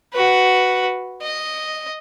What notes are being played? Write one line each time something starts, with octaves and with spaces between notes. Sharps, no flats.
F#4 B4
D#5